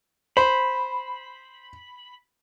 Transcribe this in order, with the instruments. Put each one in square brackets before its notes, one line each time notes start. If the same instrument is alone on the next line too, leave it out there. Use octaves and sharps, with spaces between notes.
[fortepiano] C5 [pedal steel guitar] B5